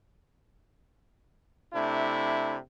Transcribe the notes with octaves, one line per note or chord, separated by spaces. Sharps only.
C3 A3 D4 E4